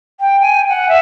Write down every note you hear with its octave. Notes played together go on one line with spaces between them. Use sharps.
G5
G#5
F#5
E5